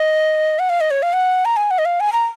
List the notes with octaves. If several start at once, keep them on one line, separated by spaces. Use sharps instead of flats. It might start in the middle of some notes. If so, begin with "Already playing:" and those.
Already playing: D#5
F#5
F5
D#5
C#5
F5
F#5
A#5
G#5
F#5
D#5
F5
G#5
A#5